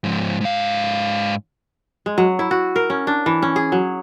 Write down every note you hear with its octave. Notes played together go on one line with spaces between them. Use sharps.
G#2 F3
G#2 F5
G#3
F#3
E4
F#4
A#4
C#4
D4
E3
C#4
G#4
F#3